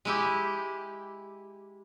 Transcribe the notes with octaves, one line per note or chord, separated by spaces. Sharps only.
G#3 E4 G4